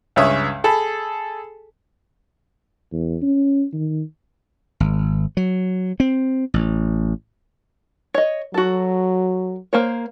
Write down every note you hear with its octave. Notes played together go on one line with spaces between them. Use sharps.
C#2 G2 C#4 C#5 E5 D#6
G#4 A4 A5 B5
E2
C#4
D#3
G#1
F#3
C4
A1
C#5 D#5
F#3 F#4 A4
A#3 C5 C#5